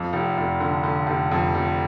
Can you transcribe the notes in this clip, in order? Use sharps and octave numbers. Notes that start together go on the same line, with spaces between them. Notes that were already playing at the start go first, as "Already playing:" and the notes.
Already playing: F2
F1
F1
D3
D3
F1
F2
F1